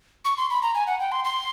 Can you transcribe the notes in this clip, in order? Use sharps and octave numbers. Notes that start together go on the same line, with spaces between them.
C#6
C6
B5
A#5
G#5
F#5
G5
C6
C6